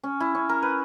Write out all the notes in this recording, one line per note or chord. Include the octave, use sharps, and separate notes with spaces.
C#4
E4
C#4
A#4
B4